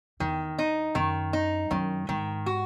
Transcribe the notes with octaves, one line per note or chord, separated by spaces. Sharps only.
E2 D#3
D#4
F#2 D#3
D#4
F#2 D#3
G#2 D#3
F#4